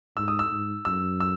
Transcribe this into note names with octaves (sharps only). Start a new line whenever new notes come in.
G#2 E6
D#6
E6
G#2
F#2 E6
E6